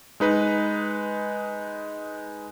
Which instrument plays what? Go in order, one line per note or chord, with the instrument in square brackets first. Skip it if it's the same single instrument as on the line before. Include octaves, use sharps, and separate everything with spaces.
[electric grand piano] G#3 D#4 B4